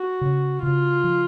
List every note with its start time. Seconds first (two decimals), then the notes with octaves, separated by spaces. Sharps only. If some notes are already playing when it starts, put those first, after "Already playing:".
Already playing: F#4
0.21 C#3
0.62 C#3 F4
1.04 F3